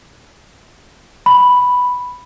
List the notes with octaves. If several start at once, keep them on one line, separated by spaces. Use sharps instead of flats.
B5